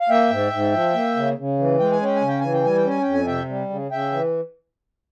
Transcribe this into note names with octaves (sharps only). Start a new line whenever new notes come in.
F5
A#3 E5 G5
G#2
G#2
F3
A#3
C#3
C#3
E3
G#3 G5
G#5
C#4 G5
G#5
C#3
G5
E3 G#5
G5
G3 G#5
G5
C#4 G#5
F2 G5
G#5
C3 E5 G5
G3
C#3
C#3 E5 G5
E3